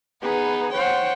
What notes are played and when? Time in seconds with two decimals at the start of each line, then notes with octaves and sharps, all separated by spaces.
0.23 B3 D#4 G#4 B4
0.72 C5 C#5 F#5 G5